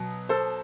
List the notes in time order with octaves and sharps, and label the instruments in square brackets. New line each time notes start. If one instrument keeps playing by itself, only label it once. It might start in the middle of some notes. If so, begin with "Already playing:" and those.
Already playing: [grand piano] B2 F#3
A4 C5